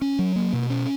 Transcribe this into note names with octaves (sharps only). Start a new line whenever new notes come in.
C#4
F#3
A#3
B2
C#4